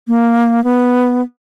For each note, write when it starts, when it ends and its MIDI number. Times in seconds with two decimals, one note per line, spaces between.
0.08 0.63 58
0.64 1.22 59